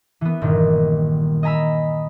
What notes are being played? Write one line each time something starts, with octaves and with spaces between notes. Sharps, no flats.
E3 B3
G1 A#2 D#3
D#5 G#5 A#5 B5 E6